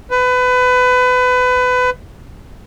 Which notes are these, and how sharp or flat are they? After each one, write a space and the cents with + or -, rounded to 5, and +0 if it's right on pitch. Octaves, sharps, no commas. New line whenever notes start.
B4 +25